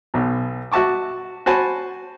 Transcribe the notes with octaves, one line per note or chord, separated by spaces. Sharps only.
B1 B2
F#4 E5 A5 C#6 D6
F#4 C5 G#5 A5 B5